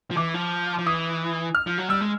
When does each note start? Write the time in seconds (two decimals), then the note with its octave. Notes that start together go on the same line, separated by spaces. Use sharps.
0.11 F3
0.17 E3 D6
0.34 F3
0.79 F3
0.86 E3 D#6
1.55 F6
1.67 F3
1.78 F#3
1.90 G3 E6
2.01 G#3